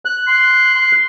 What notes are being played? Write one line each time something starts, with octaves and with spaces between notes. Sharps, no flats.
F#6
C6
C6